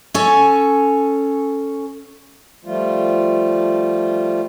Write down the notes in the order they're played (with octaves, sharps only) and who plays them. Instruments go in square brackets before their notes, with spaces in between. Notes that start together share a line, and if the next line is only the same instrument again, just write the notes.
[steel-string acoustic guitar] C#4 A4 C#5 G#5
[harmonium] F3 G3 A3 F4